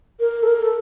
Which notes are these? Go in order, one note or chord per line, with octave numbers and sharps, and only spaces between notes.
A#4
A4
A#4
A4